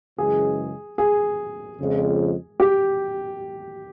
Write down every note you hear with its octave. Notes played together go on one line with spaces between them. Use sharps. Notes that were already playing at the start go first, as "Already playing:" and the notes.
F#2 C#3 E3 G#3 G#4
G#4
F2 C#3 F3 G#3
G4